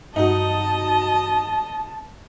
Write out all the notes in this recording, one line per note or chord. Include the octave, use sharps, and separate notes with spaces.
G2 D#4 F#4 D#5 A5